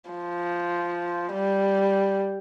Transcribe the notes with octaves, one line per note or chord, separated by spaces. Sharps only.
F3
G3